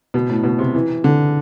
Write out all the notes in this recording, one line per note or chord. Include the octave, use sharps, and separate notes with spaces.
B2
A2
B2
C3
E3
D3